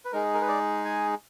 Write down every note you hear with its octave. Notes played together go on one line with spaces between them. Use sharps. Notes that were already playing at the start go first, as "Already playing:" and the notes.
B4
G#3 D#4 G#4 A#4
A#4
B4
D5
G#5